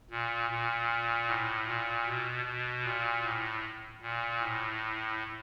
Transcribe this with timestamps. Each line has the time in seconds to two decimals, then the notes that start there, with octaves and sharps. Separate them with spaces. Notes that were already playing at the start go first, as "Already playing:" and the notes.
0.10 A#2
0.50 A#2
1.28 A2
1.67 A#2
2.07 B2
2.45 B2
2.84 A#2
3.24 A2
4.02 A#2
4.41 A2